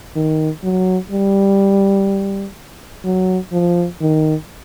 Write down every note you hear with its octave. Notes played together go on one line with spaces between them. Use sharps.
D#3
F#3
G3
F#3
F3
D#3